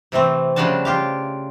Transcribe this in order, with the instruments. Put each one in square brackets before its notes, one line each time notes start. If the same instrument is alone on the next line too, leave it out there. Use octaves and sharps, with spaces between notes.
[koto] C3 E3 A3 C4
C#3 F3 G3 D4 F#4 A5
F4 G4 F5